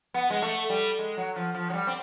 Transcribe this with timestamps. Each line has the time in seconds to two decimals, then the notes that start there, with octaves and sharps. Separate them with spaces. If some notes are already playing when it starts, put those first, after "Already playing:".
0.14 B3
0.30 G#3
0.42 A3
0.70 G3
0.99 G#3
1.17 F#3
1.36 F3
1.55 F3
1.70 F#3
1.73 G3
1.87 C4